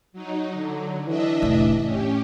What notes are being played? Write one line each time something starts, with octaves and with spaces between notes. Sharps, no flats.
F#3 D#4
D3 F#3
E3 D4 D#5 E5
F1 A2
A2 C#4 G4